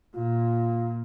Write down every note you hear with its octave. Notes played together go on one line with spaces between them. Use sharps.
A#2 F4